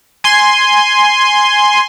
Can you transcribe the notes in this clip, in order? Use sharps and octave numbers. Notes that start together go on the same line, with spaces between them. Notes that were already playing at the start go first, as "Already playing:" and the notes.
G#5 C6